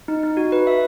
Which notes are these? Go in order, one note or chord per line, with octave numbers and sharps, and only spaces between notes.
D#4
D#4
F#4
B4
E5